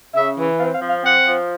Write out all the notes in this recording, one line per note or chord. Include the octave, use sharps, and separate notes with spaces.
C#3 E5
E3
C4 F5
F5
F3
F5
C4 F#5
F3